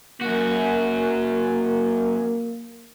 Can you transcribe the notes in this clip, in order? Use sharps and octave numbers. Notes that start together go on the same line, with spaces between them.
F#2 A#3 F#4